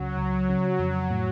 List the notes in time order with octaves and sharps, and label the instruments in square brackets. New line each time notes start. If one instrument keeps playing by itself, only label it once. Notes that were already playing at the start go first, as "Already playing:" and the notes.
Already playing: [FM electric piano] C#2 C#3 [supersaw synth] F#3
[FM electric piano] C#2
C#3
F2
A2